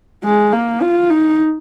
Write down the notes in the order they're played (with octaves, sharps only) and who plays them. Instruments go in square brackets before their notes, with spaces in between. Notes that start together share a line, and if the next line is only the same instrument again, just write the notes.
[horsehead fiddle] G#3
A#3
F4
D#4